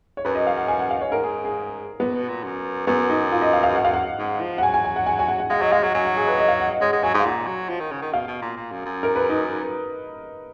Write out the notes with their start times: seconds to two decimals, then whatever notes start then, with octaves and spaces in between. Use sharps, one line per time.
0.17 C#5
0.25 F#2 B4
0.35 D#5
0.47 F5
0.57 F#5
0.68 G#5
0.79 F#5
0.91 F5
1.01 C#5
1.12 G#2 A#4
1.24 G#4
1.45 G#4
2.00 A#2 B3
2.14 B2
2.29 A#2
2.44 F#2
2.87 F#2 B3
3.10 D#4
3.32 F4
3.42 D#5
3.53 F5
3.63 F5
3.75 F#5
3.85 F5
3.93 F#5
4.19 G#2
4.41 F3
4.58 F#5
4.63 F#3 G#5
4.74 G#5
4.85 G#5
4.96 F#5
5.06 G#5
5.19 G#5
5.28 F#5
5.40 F#5
5.50 G#3 F5
5.62 F#3 D#5
5.72 G#3 F5
5.83 F#3 F#5
5.94 F#3 G#5
6.05 F#5
6.16 G#4
6.27 B4
6.38 D#5
6.48 F5
6.60 F#5
6.70 D#5
6.81 G#3 C#5
6.93 G#3
7.03 F#3 G#5
7.14 G#2
7.20 F5
7.25 A#2 F#5
7.47 F#3
7.69 F3
7.80 D#3
7.92 C#3
8.02 D#3
8.13 B2 F5
8.28 B2
8.42 A#2
8.56 A#2
8.72 F#2
8.86 F#2
9.03 A#4
9.16 B4
9.29 D#4